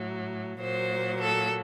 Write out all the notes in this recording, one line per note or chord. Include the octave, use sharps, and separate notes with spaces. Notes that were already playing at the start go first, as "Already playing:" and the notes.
Already playing: A2 F#3
A#2 F#3 C5
A4